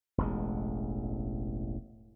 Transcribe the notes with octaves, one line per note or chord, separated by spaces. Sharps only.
E1 A1 G#3